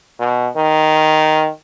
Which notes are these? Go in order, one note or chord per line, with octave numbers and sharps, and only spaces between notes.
B2
D#3